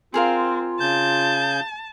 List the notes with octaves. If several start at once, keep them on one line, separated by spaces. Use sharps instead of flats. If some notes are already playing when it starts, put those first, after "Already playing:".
C4 F4 G#4 A#4 F5
C#3 A5 G6